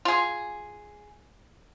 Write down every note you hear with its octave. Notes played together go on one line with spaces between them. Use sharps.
F4 G#4